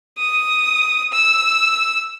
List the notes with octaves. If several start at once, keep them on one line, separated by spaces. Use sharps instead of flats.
D#6
E6